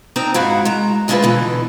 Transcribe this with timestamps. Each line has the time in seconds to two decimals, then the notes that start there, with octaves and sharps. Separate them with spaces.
0.16 C4 D4 D#4 A#4
0.34 G#2 E4 F#4 F5
0.65 G#3 A#5
1.08 D2 G#3 D4 E4 F4 B4
1.23 B2 D3 E3